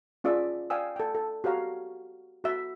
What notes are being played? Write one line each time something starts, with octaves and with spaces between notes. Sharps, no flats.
C#4 F4 G#4 D5 E5 E6
D5 F5 G5 G#5 D#6 E6
A4 G5
A4
F#4 G4 C#5 F5 A#5
F#4 E5